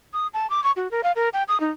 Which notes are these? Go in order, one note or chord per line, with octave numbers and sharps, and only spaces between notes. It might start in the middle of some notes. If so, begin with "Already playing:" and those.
D#6
A5
D6
C#6
F#4
A#4
F5
A#4
G5
D#6
D#4